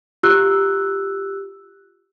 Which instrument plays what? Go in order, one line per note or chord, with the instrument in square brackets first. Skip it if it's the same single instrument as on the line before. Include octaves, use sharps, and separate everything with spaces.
[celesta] F4 G4 E6 F#6